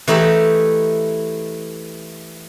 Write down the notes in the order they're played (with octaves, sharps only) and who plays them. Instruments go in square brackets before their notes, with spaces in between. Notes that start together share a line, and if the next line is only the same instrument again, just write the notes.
[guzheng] E3 A3 D#4 E4 G4